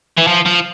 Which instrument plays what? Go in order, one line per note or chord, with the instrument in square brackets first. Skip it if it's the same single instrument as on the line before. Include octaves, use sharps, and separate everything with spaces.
[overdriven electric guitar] E3
F3
F3